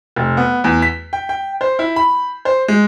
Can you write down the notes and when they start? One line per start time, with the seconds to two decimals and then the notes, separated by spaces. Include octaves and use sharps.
0.16 F1
0.37 B3
0.64 E2
0.82 B6
1.13 G5
1.29 G5
1.61 C5
1.79 E4
1.96 B5
2.45 C5
2.68 G#3